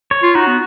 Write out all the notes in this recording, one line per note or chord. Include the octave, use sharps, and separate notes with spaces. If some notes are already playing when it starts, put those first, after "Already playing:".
C#5
F4
D#4 F#4
B3